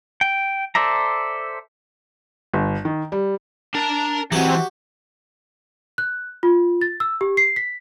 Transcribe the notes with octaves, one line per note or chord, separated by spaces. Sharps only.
G5
A4 C5 D5 E5 A#5
G1
D#3
G3
D4 A#4 A5
E3 F#3 G#3 C4 F#4 G4
F#6
F4
A6
E6
G4
C7
B6